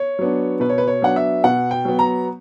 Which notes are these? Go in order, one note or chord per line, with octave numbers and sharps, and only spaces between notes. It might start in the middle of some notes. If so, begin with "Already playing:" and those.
Already playing: C#5
F#3 B3 D4
B2 B4
C#5
B4
C#5
F#3 B3 D4 F#5
E5
B2 F#5
G5
F#3 B3
A#5